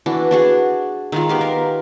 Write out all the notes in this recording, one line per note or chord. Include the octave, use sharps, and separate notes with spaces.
E3 D4 F#4
D4 F#4 G#4
D#3 G#3 F4
B3 G4 F5
A#4